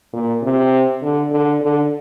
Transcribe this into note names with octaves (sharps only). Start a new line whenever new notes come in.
A#2
C3
D3
D3
D3